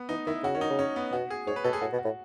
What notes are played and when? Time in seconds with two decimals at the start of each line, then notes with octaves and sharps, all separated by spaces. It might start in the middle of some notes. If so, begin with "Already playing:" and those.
Already playing: B3
0.09 E3 D#4
0.27 D#3 E4
0.43 C#3 F#4
0.55 D#3 C#4
0.61 D#4
0.70 C#3
0.79 C#4
0.96 B3
1.12 B2 F#4
1.30 G#4
1.47 G#2 C#5
1.56 B4
1.64 B2 A4
1.73 G#4
1.81 A2 F#4
1.93 B2
1.99 F#4
2.05 A2